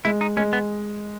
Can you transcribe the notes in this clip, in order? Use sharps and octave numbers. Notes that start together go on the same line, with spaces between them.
G#3 E4
D#4
G#3 C#4
B3